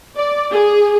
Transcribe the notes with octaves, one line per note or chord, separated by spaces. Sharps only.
D5
G#4